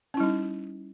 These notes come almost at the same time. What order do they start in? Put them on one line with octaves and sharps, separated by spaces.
C#4 E4 G3 D#4